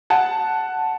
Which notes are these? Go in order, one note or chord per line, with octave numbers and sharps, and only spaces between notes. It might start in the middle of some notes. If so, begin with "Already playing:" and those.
F#5 A5